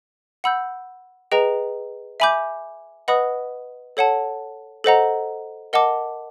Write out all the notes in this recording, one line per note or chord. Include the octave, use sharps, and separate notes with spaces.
F#5 B5 E6 G6
G#4 B4 D#5 G5 A#5
E5 G#5 B5 D6 G6
B4 D#5 F#5 B5 D#6
A4 C#5 F#5 A5
A4 C5 D#5 F#5 A#5
A#4 D#5 F#5 A5 D6